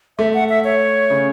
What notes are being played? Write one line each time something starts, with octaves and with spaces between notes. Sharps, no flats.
A3 E5
F#5
E5
C#5
C#3